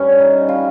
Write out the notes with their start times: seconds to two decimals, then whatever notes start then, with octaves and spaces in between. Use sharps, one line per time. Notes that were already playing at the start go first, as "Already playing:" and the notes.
Already playing: G2 G3 C#4
0.20 D#4
0.48 G3 F4